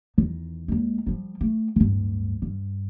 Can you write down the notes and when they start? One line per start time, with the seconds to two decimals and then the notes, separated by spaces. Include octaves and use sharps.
0.18 E2 D#3
0.68 D#2 G#3
1.06 F3 G3
1.41 A3
1.76 D1 G2
2.42 G2